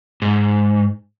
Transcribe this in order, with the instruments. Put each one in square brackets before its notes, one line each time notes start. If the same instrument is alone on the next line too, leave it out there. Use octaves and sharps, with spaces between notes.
[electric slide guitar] G#2